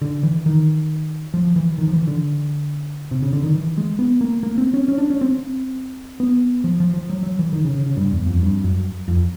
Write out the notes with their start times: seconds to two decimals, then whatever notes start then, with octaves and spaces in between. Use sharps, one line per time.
0.02 D3
0.23 E3
0.46 D#3
1.34 F3
1.56 E3
1.78 D#3
1.88 F3
1.93 E3
2.07 D3
3.11 C3
3.22 C#3
3.33 D3
3.43 D#3
3.54 E3
3.77 G#3
3.99 B3
4.21 A#3
4.43 A#3
4.58 C4
4.74 C#4
4.88 C#4
4.98 D4
5.10 C#4
5.21 C4
6.20 B3
6.64 F3
6.80 F3
6.94 F3
7.10 F#3
7.23 F#3
7.39 E3
7.53 D#3
7.64 C#3
7.75 C#3
7.86 C#3
7.97 G2
8.13 E2
8.26 F2
8.42 G2
8.64 F#2
9.08 F2